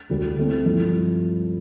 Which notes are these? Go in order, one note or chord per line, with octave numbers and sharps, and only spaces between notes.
D2 D3 G3
D3 A3 C4 E4
G2 F3 A3 E4